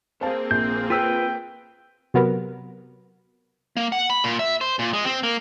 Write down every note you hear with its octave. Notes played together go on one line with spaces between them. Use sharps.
A#3 C4 G#4 C5 F5 A5
A#1 G6
F4 B4 G5 E6 B6
C3 F#3 B3 A#4 B4
A#3
F#5
B5
A#2
E5
C5
A#2
G#3
C4
A#3